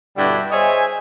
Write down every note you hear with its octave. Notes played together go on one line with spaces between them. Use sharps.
G2 B2 D3 G3 E4 F#4
G#4 C5 C#5 D#5 E5 G#5